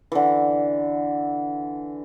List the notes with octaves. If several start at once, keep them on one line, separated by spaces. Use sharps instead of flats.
D3 E3